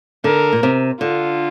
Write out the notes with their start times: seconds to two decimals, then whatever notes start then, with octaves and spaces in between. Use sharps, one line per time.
0.24 D3 A#4
0.53 A#2
0.63 C3
1.01 D3 F4